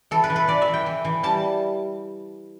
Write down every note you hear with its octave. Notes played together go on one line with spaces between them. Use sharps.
E3 A4
B4
E3
B4
E3 D5
E5
E3
G5
E3
E3
G3 A5